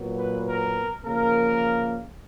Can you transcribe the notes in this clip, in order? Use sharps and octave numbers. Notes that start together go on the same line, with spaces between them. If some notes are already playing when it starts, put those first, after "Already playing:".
Already playing: A#2 F#3 B3
B4
A#4
C#3 F3 A#3 A#4